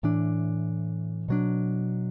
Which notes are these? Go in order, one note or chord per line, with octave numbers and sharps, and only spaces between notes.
A2 E3 D4
B2 F#3 D4